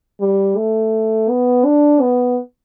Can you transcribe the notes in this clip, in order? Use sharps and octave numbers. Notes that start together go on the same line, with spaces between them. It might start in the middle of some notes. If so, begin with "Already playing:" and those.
G3
A3
B3
D4
B3